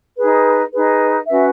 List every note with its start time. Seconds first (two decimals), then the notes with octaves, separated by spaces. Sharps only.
0.17 D#4 G#4 B4
0.71 D#4 G#4 B4
1.27 C#4 F#4 B4 E5